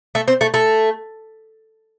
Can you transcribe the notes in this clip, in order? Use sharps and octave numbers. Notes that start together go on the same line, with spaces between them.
A3
C4
A3
A3